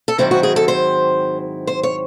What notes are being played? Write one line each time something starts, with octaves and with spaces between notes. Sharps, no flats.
A4
G#2 D#3 F#3 C4 E4 C5
F#4
G#4
A4
C5
C5
C#5